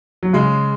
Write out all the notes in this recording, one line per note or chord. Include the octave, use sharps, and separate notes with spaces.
F#3
C#3 G#3